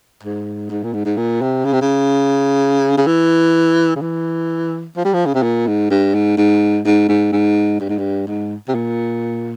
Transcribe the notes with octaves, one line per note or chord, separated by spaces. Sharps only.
G#2
G#2
A#2
G#2
G#2
A#2
C3
C#3
C3
C#3
C#3
E3
C#3
E3
F3
G3
F3
C#3
C3
A#2
G#2
G2
G#2
G#2
G#2
G#2
G#2
G2
G#2
G2
G#2
C3
A#2